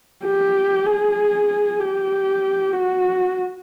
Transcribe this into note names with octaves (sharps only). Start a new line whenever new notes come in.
G4
G#4
G4
F#4